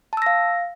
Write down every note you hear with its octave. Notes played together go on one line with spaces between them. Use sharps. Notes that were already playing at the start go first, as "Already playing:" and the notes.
F5 A5 E6 A#6